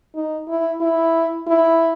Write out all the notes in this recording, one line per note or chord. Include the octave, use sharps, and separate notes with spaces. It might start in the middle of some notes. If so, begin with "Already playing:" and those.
D#4
E4
E4
E4